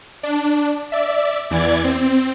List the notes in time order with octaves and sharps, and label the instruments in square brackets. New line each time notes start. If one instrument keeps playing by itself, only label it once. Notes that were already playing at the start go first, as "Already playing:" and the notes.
[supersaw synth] D4
D5 E5
E2 E3 D5 G#6
C4